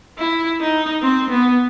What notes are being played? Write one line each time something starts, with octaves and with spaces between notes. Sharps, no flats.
E4
D#4
C4
B3